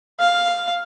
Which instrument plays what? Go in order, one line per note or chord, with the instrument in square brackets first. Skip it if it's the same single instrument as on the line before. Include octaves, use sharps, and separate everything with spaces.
[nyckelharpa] F5